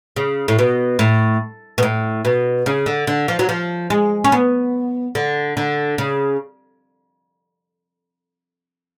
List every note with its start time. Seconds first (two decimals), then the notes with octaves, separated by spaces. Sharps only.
0.16 C#3
0.48 A2
0.59 B2
0.99 A2
1.78 B2
1.83 A2
2.25 B2
2.66 C#3
2.86 D3
3.07 D3
3.28 F3
3.39 F#3
3.49 F3
3.90 G#3
4.24 C#4
4.32 B3
5.15 D3
5.57 D3
5.98 C#3